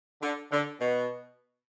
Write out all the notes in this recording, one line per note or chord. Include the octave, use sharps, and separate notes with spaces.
D3
D3
B2